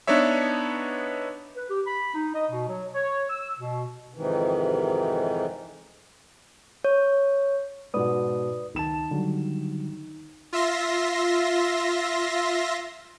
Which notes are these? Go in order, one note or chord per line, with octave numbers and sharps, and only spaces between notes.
B3 D4 D#4 B4 C#5 E5
B4
G4
B5
D#4
D#5
B2
F#3
C#5
E6
B2
F2 G#2 C3 D#3 E3
C#5
G#2 B2 B4 D5 D#6
C#2 D#3 A5 E7
D3 F#3 G3
F4 E5 C6 A#6